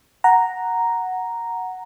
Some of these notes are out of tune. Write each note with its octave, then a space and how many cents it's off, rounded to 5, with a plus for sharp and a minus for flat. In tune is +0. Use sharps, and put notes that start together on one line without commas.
F#5 +0 A#5 +0